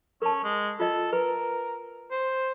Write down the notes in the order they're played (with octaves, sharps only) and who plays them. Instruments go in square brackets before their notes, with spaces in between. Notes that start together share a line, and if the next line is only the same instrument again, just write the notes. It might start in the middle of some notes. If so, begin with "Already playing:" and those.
[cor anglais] C#4 [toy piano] A#4 A5
[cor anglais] G#3
[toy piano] F4 D#5 [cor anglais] A4
[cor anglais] A#4 [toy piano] B4
[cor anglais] C5